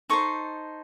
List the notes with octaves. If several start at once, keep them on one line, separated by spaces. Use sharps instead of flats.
D#4 A4 C5 C#6